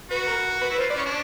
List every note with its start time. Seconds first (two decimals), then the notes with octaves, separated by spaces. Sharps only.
0.10 F#4 B4
0.27 A#4
0.62 B4
0.70 E4
0.75 B4
0.78 F4 C5
0.90 D5
0.96 C#4 C#5
1.05 D4